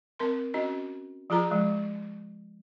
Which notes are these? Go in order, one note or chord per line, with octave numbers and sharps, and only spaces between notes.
C4 A#4 C6
C#4 F#4 D#5
F3 F4 G#4 A#5
F3 G#3